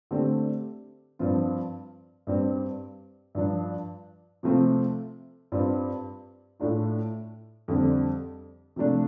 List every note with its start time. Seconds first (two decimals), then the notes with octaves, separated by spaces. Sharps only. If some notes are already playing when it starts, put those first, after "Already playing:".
0.11 D3 A3 C4 G4
1.19 G2 F3 C4 F4
2.27 G2 G3 C4
3.35 G2 F3 D4
4.43 C3 F3 A3 C4 F4
5.52 G2 G3 C4 F4
6.60 A2 A3 D4 F4
7.68 F2 D3 G3 C4
8.76 C3 F3 A3 D4